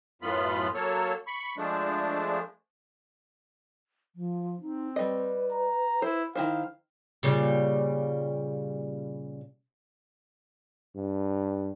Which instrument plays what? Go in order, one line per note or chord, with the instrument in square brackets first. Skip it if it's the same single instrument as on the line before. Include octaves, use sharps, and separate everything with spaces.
[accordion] F#2 A2 B3 F4 B5
F#3 A#3 A4 C#5
B5 C#6
F3 G#3 A3 D4
[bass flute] F3
[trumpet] C4 [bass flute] D#4
[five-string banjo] G3 D#5 [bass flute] B4
[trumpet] A#5
[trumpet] E4 [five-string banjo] C5
[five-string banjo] D#3 E4 C5 [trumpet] F5
[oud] A#2 C#3 G3
[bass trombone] G2